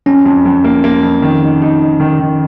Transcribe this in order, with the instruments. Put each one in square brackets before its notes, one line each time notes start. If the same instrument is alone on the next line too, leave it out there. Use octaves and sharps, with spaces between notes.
[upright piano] F2 [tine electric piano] C#4
[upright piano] F2
F2
A#3
A#3
F2
D#3
D#4
D#4
D#4
D#3
D#3